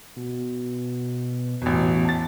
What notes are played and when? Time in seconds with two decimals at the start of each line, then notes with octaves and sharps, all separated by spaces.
0.16 B2
1.62 A1 E2 B2
2.05 A5 A6